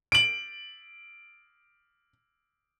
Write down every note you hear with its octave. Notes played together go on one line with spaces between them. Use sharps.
D7 F#7